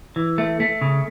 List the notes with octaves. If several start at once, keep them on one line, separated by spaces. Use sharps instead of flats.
E3
A3
A3
C#3